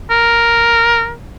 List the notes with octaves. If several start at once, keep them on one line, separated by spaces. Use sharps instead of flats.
A#4